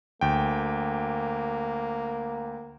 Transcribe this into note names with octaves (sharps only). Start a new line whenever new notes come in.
D2 A#3 G5